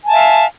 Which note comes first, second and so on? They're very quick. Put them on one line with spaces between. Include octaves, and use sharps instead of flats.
G#5 A5 E5 F5